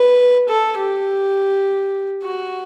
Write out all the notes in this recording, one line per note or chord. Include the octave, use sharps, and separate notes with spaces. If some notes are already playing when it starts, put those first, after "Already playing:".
Already playing: B4
A4
G4
F#4